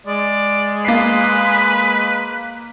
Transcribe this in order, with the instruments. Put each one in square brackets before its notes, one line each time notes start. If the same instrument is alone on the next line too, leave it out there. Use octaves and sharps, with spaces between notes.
[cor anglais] G#3 [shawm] D5
[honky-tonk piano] A#3 C7 [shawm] B4